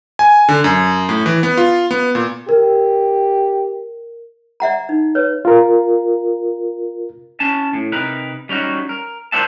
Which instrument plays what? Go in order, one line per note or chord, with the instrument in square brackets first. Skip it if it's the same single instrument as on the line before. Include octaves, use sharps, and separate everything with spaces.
[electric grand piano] G#5
D3
F#2
A2
E3
B3
F4
B3
A#2
[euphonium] G4 [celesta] A#4
[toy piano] D5 E5 F#5 A#5
D#4
B4 C#5
[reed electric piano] F4 A#4
[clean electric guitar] C#4 A5
A2
C3 D#4 A#4 B4
G3 C#4 D#4 F#4
A#4
A#4 C5 D5 E5 F#5 A5